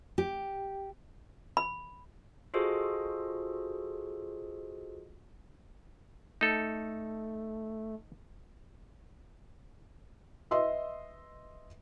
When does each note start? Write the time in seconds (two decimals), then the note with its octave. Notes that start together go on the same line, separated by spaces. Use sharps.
0.18 G4
1.57 B5
2.54 F4 F#4 G#4 A4 C5 D#5
6.41 A3 D#4 A4
10.51 B4 D#5 E5 C6 E6